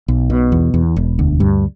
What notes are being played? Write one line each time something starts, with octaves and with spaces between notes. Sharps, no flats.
B1
B2
E2
E2
E1
D2
G2